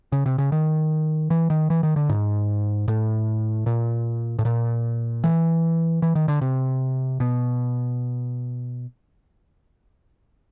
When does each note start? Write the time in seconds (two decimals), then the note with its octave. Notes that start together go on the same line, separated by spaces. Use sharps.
0.12 C#3
0.26 C3
0.38 C#3
0.52 D#3
1.30 E3
1.50 D#3
1.70 E3
1.83 D#3
1.96 D3
2.09 G#2
2.88 A2
3.66 A#2
4.39 A2
4.45 A#2
5.24 E3
6.02 E3
6.15 D#3
6.28 D3
6.41 C3
7.20 B2